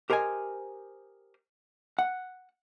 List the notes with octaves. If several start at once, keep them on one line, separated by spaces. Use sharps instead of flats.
G4 A#4 C5 D#5 G#5
F#5